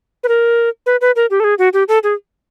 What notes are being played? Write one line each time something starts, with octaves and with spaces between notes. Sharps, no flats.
B4
A#4
B4
B4
A#4
G4
A4
G#4
F#4
G4
A4
G#4